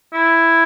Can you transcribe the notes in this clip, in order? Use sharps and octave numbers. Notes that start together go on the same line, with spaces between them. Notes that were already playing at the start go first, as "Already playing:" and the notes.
E4